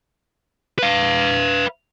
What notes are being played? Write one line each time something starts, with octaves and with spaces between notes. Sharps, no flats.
B4 F5